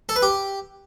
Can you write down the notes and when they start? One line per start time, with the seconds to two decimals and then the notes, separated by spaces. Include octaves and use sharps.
0.09 A4
0.16 B4
0.22 G4